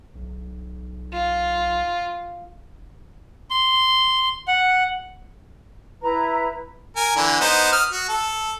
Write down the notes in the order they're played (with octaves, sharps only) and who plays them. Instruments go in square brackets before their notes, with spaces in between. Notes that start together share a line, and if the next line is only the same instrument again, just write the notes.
[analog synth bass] B1
[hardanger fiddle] F4
[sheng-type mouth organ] C6
F#5
[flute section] E4 B4 A#5
[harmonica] A#4 G#5
D3 E3
B3 D#4 C5
D#6 F6
F#4
A4